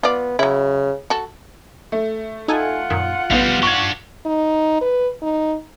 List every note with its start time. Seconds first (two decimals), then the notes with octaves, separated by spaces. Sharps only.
0.03 B3 F4 D5
0.39 C#3 F#3 E4
1.10 F#4 A4
1.92 A3
2.48 D#4 F4 A4 F#5 G#5
2.90 F#2 A#2 D#3
3.31 A1 G3 B3 C4 F5
3.63 D4 G4 C#6 G#6
4.26 D#4
4.81 B4
5.22 D#4